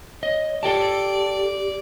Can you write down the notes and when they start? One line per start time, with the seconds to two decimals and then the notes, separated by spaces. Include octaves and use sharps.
0.23 C#5 D#5
0.63 G4 A4 D5 G5 A5